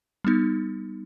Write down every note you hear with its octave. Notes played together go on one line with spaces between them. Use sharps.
G3 B3 D#4